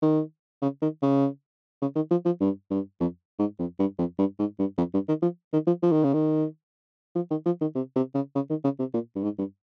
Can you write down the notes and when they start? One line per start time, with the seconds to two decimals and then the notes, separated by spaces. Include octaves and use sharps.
0.02 D#3
0.62 C#3
0.82 D#3
1.02 C#3
1.81 C#3
1.95 D#3
2.10 F3
2.25 F3
2.40 G2
2.71 G2
3.00 F2
3.39 G#2
3.59 F2
3.79 G2
3.98 F2
4.18 G2
4.39 G#2
4.59 G2
4.77 F2
4.93 G2
5.08 D#3
5.22 F3
5.53 D#3
5.67 F3
5.82 F3
5.92 D#3
6.04 C#3
6.14 D#3
7.15 F3
7.31 D#3
7.46 F3
7.61 D#3
7.75 C3
7.96 C3
8.14 C#3
8.35 C#3
8.50 D#3
8.64 C#3
8.79 C3
8.94 A#2
9.15 G2
9.23 G#2
9.38 G2